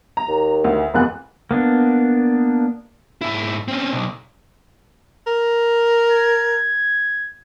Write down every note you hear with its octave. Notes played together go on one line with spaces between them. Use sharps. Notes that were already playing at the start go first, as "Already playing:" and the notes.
A#5
D#2
D2
F1 E2 A#3 F#6
A#3 B3 D4
G#2 E4
C4 C#4
B1
A#4
G#6